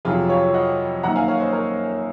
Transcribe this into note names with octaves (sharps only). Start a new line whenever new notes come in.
F2 C3 F#3 F4 G#4
C#5 F5
D#5 F#5
F#2 D#3 A#3 F#5 A#5
F5 G#5
C#5 F5
C5 D#5
A#4 C#5